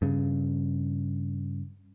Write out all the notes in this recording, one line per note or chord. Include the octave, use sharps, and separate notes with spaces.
G2 C#3